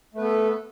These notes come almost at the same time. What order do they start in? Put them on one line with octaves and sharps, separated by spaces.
A3 B4 B3 A4